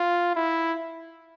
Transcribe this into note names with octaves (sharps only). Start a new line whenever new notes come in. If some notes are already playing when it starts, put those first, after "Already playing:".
Already playing: F4
E4